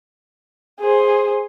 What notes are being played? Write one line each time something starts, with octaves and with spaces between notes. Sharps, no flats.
G#4 C5